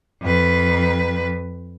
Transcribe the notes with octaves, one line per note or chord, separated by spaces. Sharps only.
F2 B4